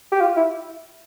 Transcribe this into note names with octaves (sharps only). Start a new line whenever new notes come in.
G4
F4
E4